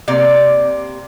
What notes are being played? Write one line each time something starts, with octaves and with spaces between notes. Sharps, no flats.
C3 A#3 D5